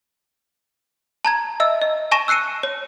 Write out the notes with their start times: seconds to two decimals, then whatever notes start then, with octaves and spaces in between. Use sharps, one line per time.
1.25 A5 A#5 G#6
1.60 D#5 E5 E6
1.81 D#5
2.11 G#5 A5 C#6 A#6 D#7 E7
2.28 E6 F#6 C7 C#7 D#7
2.63 C#5